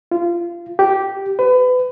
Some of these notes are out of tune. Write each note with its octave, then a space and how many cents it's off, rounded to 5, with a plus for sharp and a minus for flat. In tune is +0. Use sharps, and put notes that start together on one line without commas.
F4 -25
G4 -10
B4 +30